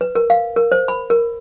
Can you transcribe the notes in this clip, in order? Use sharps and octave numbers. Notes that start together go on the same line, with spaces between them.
B4
A#4
F5
A#4
C5
B5
A#4